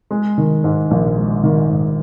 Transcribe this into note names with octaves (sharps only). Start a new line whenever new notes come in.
G#3
D#3
G#2
A#1
G#3
D#3
G#2